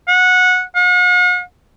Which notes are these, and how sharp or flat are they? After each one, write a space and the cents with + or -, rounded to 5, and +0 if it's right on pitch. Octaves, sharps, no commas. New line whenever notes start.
F#5 -20
F#5 -45